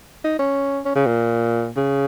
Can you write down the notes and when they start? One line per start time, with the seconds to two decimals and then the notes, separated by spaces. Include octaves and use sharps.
0.24 D#4
0.39 C#4
0.85 C#4
0.96 C#3
1.06 A#2
1.77 C#3